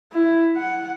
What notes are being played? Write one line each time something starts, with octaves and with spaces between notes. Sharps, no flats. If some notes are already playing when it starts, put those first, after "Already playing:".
E4
F#5